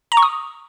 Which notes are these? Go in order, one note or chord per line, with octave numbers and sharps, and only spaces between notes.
A#5
C#6
D#6